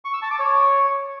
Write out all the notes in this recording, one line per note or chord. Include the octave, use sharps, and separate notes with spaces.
C#6
E6
A5
D6
C#5